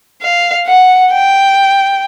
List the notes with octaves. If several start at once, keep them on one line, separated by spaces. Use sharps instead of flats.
F5
F#5
G5